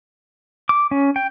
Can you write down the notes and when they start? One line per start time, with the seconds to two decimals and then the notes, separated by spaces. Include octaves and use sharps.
0.69 D6
0.91 C#4
1.16 G5